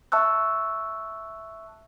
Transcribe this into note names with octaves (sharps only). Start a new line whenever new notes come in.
E5 A5 C#6 E6 F#6